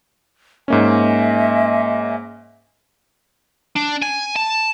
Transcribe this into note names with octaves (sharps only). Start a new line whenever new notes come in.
G#2 A#3 C#4 D#5 E5 G#5
D4
G#5
A5